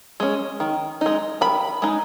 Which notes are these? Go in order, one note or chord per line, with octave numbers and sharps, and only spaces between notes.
G#3 C#4
D#3
G#3 D#4
D#3 B5
G#3 D#4